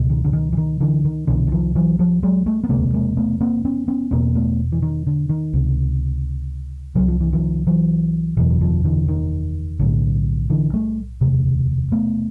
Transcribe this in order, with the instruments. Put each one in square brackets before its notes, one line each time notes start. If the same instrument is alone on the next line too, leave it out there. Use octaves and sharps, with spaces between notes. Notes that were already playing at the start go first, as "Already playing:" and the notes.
Already playing: [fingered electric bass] C#2 B2
D#3
D3
D#3
E3
D#3
D3 E3
D#3
C2 B2 D3 E3
E3
D#3 F3
E3 F#3
F3 G3
F#3 G#3
G3 A3
B3
E1 D2 C3 G#3 A#3
G#3 A#3
A3 B3
A#3 C4
B3 C#4
B3 C#4
E1 E2 B2 A#3 C4
A3 B3
E3
D#3
D3
D#3
C#2 C3
C2 C3 F#3
F3
E3
D#3 F3
E3 F#3
F#1 E2 B2 E3 F#3
F#3
D#3 F3
D3 E3
D#3
B1 A2 D3
D3 E3
G3 A3
E1 D2 C3
A3 B3